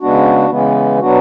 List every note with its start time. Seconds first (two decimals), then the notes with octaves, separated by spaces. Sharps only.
0.01 C#3 G#3 B3 D4 F#4
0.50 C#3 E3 G#3 B3
1.00 B2 F#3 B3 D4 F#4